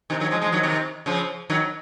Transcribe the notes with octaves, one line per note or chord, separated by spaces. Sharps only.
C3 D#3
D#3 F#3
F3 G#3
F3 G#3
D#3 F#3
C3 D#3
C#3 F3
D#3 F#3